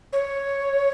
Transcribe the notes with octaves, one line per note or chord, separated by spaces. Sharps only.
C#5